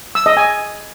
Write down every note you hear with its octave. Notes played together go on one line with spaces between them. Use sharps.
E6
D#5
G#5